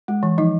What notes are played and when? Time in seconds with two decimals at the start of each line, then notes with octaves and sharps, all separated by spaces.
0.08 G#3
0.23 E3
0.38 F3 D#4